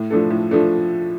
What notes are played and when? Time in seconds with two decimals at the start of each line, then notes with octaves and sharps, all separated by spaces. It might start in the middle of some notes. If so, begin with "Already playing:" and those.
Already playing: A2
0.10 F3 A3 D4 A4
0.30 A2
0.51 F3 A3 D4 A4